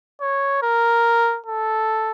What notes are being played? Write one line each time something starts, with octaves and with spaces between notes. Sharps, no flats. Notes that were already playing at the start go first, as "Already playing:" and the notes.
C#5
A#4
A4